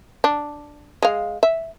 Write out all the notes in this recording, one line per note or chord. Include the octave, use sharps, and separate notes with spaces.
D4
G#3 F5
E5